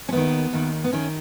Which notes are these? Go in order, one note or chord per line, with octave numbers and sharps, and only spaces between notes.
C#4
D#2 D#3 B3
D#2 D#3
B3
D#3 C#4